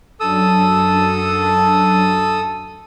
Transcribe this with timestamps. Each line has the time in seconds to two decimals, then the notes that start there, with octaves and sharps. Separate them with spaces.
0.20 F#2 F#3 D4 A4 D#6 E6